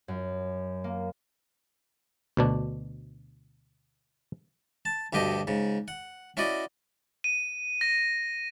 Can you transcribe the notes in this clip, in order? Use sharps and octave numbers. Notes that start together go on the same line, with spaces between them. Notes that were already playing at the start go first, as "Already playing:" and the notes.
F#2
A#3
D2 B2 D4
A5
D2 G2 B2 G4 D#5
G#2 C#3
F#5
C#4 E4 F#4 D5 D#5
D#7
A#6